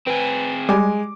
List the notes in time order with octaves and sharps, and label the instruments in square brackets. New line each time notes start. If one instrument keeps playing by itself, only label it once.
[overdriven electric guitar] C4 G#4 [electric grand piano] B4
[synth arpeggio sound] G3 [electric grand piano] G#3 G#5 D6